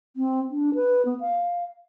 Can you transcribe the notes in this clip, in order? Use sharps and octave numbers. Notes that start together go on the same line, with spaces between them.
C4
D4
B4
B3
F5